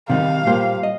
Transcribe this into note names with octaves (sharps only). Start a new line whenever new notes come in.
C3 D#3 G3 D#4 F5
A#2 G3 A#3 G4 C5
D#5